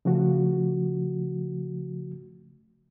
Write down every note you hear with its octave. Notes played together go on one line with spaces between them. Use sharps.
C#3 F3 A3 F#4